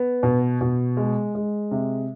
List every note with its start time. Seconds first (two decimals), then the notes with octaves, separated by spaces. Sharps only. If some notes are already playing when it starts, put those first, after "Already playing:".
Already playing: B3
0.23 B2
0.61 B2
0.97 G#3
1.35 G#3
1.71 C3